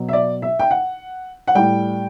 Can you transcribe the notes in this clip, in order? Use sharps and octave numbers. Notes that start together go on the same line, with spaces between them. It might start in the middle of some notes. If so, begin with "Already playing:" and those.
Already playing: B2 F#3
E5
D5
E5
G5
F#5
F#5
A2 G3 G5